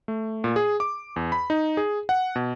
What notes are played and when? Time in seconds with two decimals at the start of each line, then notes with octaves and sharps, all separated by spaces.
0.08 A3
0.44 A#2
0.56 G#4
0.80 D6
1.16 E2
1.32 B5
1.50 D#4
1.77 G#4
2.09 F#5
2.36 B2